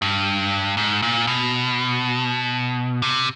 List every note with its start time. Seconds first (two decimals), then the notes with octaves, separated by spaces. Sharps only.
0.02 G2
0.77 G#2
1.02 A#2
1.27 B2
3.02 C3